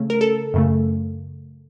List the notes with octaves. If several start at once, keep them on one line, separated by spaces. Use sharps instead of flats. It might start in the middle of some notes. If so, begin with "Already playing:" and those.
Already playing: C#3 A3 C#4
A#4
A4
F#2 C#3 A3